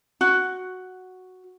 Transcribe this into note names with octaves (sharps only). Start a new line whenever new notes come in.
F#4